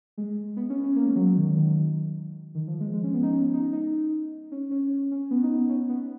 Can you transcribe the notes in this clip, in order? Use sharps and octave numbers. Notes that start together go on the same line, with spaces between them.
G#3
B3
C#4
C#4
A#3
G#3
F#3
D#3
D#3
D#3
F3
G#3
G#3
C#4
B3
D#4
C#4
D#4
D#4
C#4
C#4
C#4
B3
D#4
C#4
B3